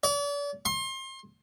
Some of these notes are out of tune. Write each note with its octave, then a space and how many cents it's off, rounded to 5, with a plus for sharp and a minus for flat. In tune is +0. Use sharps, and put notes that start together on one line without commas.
D5 -40
C6 +30